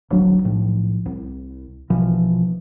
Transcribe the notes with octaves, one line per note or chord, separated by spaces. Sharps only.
D1 G#1 F#3 D4
B1 A2 F3
C2
A#1 B2 E3 F3